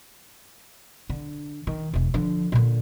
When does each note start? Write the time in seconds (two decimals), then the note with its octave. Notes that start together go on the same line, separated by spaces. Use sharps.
1.10 D3
1.67 D#3
1.93 E1 E3
2.14 D3 F3
2.52 A#2 D3